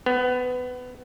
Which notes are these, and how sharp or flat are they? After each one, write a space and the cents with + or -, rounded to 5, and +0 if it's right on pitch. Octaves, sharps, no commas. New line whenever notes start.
B3 +20